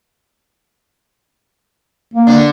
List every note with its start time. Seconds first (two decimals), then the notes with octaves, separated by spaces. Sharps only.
2.14 A#3
2.27 D3 D4